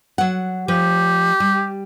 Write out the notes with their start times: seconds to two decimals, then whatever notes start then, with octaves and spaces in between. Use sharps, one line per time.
0.18 F#3 F#5
0.68 F3 G4
1.40 G3